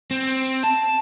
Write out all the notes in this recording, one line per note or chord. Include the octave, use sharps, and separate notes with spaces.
C4
A5